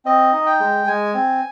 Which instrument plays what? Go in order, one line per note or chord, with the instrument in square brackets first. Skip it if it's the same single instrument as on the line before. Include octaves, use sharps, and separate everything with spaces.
[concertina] C4 D#5
D#4
G5
G#3
G#3 G#5
C4